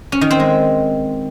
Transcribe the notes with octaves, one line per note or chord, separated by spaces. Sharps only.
C#4
D#3
C4
G#3